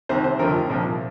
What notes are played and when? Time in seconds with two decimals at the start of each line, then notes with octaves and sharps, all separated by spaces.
0.09 C2 C3 D#3 C5
0.24 C5
0.39 F1 D#2 D3 F3 A#4
0.70 C2 A#2 F3